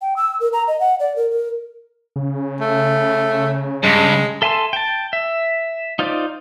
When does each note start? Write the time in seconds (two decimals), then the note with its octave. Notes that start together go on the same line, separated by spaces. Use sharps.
0.02 G5
0.16 E6
0.40 A#4
0.53 A#5
0.68 D#5
0.80 F#5
1.00 D5
1.16 A#4
1.31 A#4
2.16 C#3
2.60 A3
3.84 G2 G#3
4.42 A4 E5 G#5 A5 C6
4.73 G5 A5
5.13 E5
5.99 D#4 F4 C5 D5